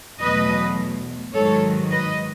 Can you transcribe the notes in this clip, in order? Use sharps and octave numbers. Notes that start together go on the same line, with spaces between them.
E2 B2 F#3 A3 B4 D#5
G#2 D#3 F#3 A4 C#5
B4 D#5